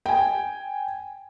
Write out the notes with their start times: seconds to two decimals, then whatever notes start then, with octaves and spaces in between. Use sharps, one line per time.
0.06 G5 G#5